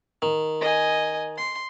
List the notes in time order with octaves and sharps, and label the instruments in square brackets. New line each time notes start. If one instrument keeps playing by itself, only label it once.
[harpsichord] D#3
[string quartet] D#5 G#5
C6